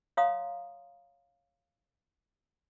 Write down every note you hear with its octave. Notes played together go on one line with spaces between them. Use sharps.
C#5 F5 F#5 A#5 C6 D#6